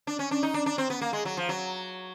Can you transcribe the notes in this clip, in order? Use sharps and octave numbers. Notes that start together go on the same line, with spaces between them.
D4
C#4
D4
D#4
D4
D4
C4
B3
A#3
G#3
F#3
F3
F#3